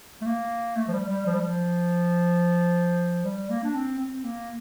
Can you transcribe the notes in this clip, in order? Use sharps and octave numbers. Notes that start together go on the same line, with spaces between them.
A3
A#3
A3
F3
G3
G3
F3
G3
F3
G3
A#3
D4
C4
C4
A#3